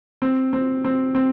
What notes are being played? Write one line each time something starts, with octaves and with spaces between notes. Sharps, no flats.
C4
C4
C4
C4